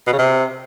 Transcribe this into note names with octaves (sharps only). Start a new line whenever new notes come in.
B2
C#3
C3